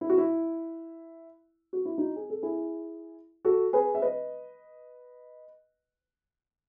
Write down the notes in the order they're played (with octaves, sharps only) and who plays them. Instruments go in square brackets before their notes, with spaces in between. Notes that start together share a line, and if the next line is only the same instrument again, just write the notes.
[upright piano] E4
F#4
E4
F#4
E4
D#4 F#4
G#4
A4
E4 G#4
F#4 A4
G#4 B4
E5
B4 D#5